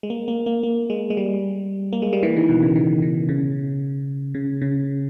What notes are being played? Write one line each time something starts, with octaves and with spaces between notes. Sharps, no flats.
G#3
A#3
A#3
A#3
A#3
G#3
G#3
G3
A#3
G#3
G3
E3
D#3
B2
C#3
D#3
D#3
C#3
C#3
C#3